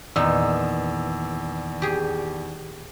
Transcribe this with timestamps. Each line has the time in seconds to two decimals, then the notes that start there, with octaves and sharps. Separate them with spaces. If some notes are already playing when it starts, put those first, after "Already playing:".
0.16 E2 A#2 D#3 B3 D#4 D5 E6
1.82 G4 G#4